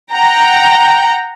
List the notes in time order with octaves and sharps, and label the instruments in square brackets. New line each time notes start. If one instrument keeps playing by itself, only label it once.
[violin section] F#5 G5 A#5